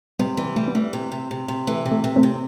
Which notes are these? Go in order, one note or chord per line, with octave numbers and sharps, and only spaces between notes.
C3 G3 B3
E3 G3 B3
G3 A3
B3
E3 A3
C3
C3
C3
C3
E3 A3
C3
A3
C3
A3 C4
C3